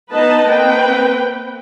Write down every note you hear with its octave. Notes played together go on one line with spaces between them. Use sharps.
B3 D#4 B4 D#5 A5
A#3 C4 B4 G5